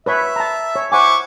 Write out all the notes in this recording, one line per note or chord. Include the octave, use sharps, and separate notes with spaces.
B4 C#5 E5 B5
A5 A#5
C#5
E4 C5 F#5 G#5 C#6 D6